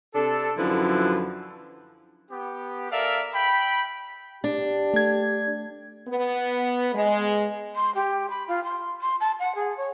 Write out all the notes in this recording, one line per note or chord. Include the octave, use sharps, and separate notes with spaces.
C3 D4 A4
F#2 D3 F3 E4 B4
B3 G4
A4 A#4 D5 E5 F5
G5 B5
D4 G4
A3 G#6
B3
G#3
C6
G4
B5
F4
C6
C6
A5
F#5
G#4
C#5